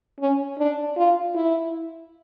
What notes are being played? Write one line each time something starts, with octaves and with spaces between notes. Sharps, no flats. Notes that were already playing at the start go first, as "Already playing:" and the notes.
C#4
D4
F4
E4